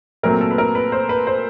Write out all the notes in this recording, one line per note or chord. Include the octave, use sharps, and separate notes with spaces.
A#2 F#3 A3 C4 A#4
A4
B4
A#4
B4
C5
B4
C5